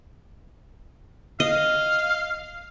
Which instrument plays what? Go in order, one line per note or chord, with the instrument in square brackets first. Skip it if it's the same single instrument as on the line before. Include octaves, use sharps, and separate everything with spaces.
[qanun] D#5 [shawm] F5